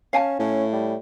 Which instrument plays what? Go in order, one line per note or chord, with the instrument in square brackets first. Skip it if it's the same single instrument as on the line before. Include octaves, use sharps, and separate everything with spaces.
[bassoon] C#4 [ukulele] F5 G#5 A5
[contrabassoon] A2 [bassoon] C#4
[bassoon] G3